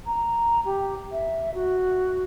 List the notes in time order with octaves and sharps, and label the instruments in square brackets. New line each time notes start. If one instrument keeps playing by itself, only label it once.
[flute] A#5
G4
E5
F#4